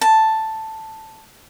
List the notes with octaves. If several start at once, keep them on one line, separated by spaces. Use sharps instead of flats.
A5